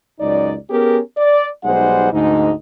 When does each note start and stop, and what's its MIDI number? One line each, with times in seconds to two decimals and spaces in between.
0.20 0.55 37
0.20 0.55 42
0.20 0.55 63
0.20 0.55 74
0.70 0.99 59
0.70 0.99 61
0.70 0.99 67
0.70 0.99 68
0.70 0.99 70
1.17 1.48 74
1.64 2.11 35
1.64 2.11 55
1.64 2.11 56
1.64 2.11 63
1.64 2.11 72
1.64 2.11 78
2.12 2.52 38
2.12 2.52 44
2.12 2.52 63